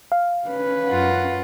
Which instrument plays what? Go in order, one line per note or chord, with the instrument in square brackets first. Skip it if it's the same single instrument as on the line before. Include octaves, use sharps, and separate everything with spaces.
[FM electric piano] F5
[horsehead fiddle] C#4 B4
[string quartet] F#2 F4 F#5